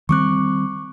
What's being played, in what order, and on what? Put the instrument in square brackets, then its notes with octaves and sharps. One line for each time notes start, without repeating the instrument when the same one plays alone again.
[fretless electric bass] D#3 G3 C4 [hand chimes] C#6 D6 F#6